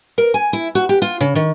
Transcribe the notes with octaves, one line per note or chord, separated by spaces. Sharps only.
A#4
G#5
E4
F#4
G4
F4
C#3
D#3